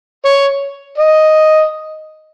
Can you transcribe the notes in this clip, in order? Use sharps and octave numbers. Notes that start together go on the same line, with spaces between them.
C#5
D#5